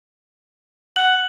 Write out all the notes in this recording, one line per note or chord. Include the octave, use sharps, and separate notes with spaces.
F#5 F#6 F#7